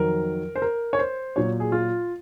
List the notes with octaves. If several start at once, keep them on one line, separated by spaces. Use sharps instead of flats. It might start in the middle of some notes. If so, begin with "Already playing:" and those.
Already playing: F2 D#3 F#3 A#4
C5
A#4
C#5
C5
A#2 F#3 C#5
G#4
F4